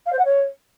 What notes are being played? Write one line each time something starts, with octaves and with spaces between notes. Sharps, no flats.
F5
C5
F#5
C#5